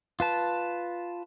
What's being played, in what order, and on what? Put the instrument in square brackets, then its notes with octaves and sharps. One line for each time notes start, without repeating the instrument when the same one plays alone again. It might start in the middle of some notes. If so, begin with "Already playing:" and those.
[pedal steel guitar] F4 B4 A5